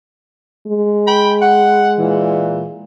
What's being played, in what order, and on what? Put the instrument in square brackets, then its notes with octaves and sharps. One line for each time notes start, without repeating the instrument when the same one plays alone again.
[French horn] G#3
[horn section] G5 B5
F#5
A#2 E3